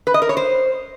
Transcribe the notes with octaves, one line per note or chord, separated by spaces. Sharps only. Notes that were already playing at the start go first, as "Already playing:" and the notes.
B4
D#5
A#4
C#5
C5